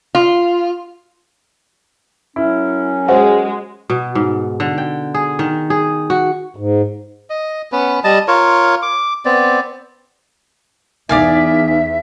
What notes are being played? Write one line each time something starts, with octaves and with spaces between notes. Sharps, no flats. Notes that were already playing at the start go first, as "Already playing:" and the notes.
F4
F#2 F#3 C#4 E4
G#3 F#4 C5
B2
G#2
D3
G5
G#4
D#3
G#4
F#4
G#2
D#5
B3 C#4 B4
G3 D#5 A5
F4 A#4 C#5
D6
B3 C4 D5
E2 D#4 D5 E5 F5 G#5